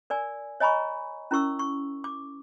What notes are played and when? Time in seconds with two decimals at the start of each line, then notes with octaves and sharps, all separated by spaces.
0.10 A#4 D5 G#5
0.60 C#5 D#5 G#5 A#5 B5 C#6
1.31 C#4 E4 A#4 C#6 E6
1.59 C#6
2.04 D6